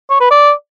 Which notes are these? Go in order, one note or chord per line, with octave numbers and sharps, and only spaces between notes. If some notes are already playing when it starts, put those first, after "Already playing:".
C#5
B4
D5